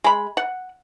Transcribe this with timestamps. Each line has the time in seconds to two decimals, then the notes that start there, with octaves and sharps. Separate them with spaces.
0.04 G#3 B5
0.37 F#5